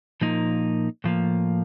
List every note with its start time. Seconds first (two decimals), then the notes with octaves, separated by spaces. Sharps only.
0.21 A#2 F3 A#3 D#4
1.04 A2 F3 A#3